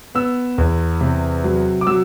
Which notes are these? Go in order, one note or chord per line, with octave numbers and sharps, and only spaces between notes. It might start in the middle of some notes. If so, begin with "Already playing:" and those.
B3 E6
E2
C3
F#3
D6
F#3 E6